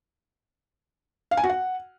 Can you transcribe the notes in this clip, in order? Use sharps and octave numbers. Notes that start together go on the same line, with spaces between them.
F5
G#5
F#4
F#5